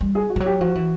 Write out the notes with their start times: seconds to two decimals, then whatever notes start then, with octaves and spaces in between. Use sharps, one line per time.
0.01 G3
0.15 G#4
0.30 F#4
0.36 F3
0.40 F#3
0.46 G4
0.61 F3 F#4
0.75 E3